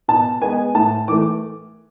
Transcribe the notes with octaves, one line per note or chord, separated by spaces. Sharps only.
B2 A5
G#3 B3 G#5
A2 A5
E3 A3 D6